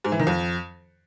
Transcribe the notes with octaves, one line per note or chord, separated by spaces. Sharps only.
G#2
E3
D#3
F2